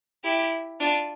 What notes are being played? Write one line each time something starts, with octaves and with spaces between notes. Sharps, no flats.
E4 G4
D4 F4